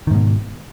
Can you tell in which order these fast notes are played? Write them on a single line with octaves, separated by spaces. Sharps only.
D#3 G#2 B2